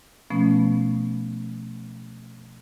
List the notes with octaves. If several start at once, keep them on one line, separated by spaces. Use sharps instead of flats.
B2 F3 A3 B3 C#4